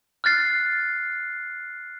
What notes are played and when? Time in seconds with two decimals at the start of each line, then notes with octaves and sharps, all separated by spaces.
0.24 F6 F#6 A6 C7